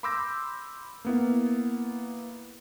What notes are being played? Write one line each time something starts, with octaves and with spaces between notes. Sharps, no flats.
B5 C6 D6 E6 G6 A#6
A#3 B3 E4